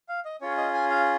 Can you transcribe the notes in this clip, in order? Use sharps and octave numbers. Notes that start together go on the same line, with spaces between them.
F5
D#5
C#4 F4 G#4 C#5
D#5
G#5
F5